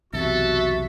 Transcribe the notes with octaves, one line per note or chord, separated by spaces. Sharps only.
B1 E2 C3 F#4 A4 E5